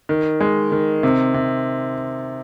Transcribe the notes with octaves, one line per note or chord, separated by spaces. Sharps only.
D#3
G#3
D#3
C3
C3